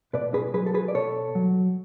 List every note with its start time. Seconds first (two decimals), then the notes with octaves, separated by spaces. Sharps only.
0.13 B2 B4 D5
0.34 G#4 B4
0.54 F#3 G#4 B4
0.66 A4
0.74 G#4 B4
0.88 D5
0.94 B2 A4 C#5
1.35 F#3